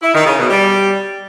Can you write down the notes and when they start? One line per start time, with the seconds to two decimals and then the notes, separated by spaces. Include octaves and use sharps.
0.02 E4
0.14 D#3
0.26 C#3
0.38 B2
0.50 G3